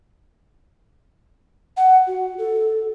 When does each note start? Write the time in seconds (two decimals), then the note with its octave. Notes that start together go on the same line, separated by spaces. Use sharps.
1.77 F#5
2.07 F#4
2.38 A4